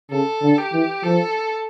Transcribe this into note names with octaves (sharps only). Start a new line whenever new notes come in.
C#3 A4
D3
G4
E3
F3 A4